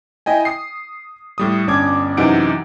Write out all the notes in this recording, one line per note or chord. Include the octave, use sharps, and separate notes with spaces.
E4 D#5 G5 G#5
D#6 C7
A2 G3 D#6
G1 C#4 D4 D6 G#6
F#2 C3 E3 D#4 F#5 D7